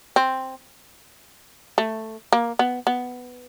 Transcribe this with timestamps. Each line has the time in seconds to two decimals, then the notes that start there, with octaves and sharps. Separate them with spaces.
0.16 C4
1.78 A3
2.33 A#3
2.59 B3
2.87 B3